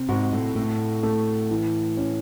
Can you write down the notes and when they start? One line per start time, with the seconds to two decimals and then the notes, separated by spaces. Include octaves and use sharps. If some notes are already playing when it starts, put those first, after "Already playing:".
Already playing: C3 C4
0.09 G#2 F#4
0.32 A2
0.55 A2 A3
1.03 A3
1.51 E3
1.97 C#4